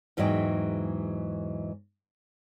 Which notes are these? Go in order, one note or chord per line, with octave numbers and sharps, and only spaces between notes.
E2 G#2 E3 F#3 D#5 G5